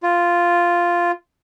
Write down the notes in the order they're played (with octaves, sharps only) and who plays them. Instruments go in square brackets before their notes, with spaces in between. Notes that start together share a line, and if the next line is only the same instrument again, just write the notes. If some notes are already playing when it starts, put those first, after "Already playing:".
[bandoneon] F4